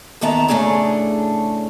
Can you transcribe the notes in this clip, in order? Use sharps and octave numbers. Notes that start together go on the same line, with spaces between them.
E2 D#3 B3 E5 A5 A#5
A2 C#3 A3 D4 G#4 A4